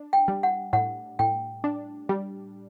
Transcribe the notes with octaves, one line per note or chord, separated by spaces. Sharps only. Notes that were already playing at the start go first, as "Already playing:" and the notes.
Already playing: D4
G5
G3
F#5
A2 F#5
A2 G5
D4
G3